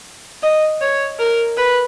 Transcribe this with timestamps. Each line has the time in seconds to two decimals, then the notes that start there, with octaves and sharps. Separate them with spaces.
0.43 D#5
0.81 C#5
1.19 A#4
1.57 B4